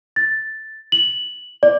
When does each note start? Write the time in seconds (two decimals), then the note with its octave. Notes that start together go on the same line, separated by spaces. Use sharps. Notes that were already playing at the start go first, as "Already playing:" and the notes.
0.16 A6
0.92 F#7
1.63 D5